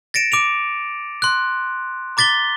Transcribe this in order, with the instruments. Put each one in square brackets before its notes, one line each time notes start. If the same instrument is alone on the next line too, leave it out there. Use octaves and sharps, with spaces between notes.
[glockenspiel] A6 A#6 C#7 D7 E7
D6 D7 F7
C6 F#6
A#5 D6 A6 B6 G7